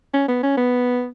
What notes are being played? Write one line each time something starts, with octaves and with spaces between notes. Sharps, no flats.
C#4
B3
C#4
B3